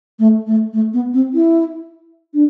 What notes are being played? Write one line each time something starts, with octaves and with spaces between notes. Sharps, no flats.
A3
A3
A3
B3
C4
E4
D4